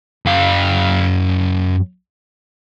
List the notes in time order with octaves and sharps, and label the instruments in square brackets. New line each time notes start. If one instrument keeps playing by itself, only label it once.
[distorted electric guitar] F#2 F5